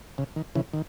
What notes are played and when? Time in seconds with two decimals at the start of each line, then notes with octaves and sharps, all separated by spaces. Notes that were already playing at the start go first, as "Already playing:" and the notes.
0.18 C#3
0.36 D#3
0.55 C#3 E3
0.74 D#3